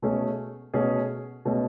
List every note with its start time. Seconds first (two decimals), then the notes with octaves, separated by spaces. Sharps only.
0.02 B2 A3 C#4 G#4
0.74 B2 A3 C#4 G#4
1.45 B2 A3 C#4 G#4